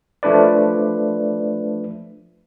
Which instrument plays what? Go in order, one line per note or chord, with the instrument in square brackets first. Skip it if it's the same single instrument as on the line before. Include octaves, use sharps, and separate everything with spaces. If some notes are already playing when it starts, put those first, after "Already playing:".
[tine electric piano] F3 A3 D4 B4 D5